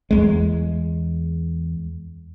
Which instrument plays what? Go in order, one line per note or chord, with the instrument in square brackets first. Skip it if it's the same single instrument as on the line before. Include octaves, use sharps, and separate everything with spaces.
[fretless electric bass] E2 G#3